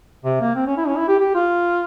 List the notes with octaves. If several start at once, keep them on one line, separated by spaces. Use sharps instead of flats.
C3
A#3
C4
C#4
E4
C#4
E4
G4
G4
F4